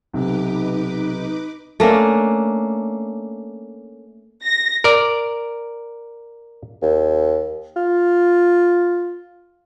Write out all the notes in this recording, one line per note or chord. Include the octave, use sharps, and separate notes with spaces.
B1 C3 D#4 B4 D6
A3 A#3 C#4 D4
A#6
A#4 D5
D#2
F4